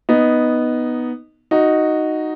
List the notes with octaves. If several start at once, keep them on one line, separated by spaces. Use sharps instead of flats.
B3 D#4
D#4 F#4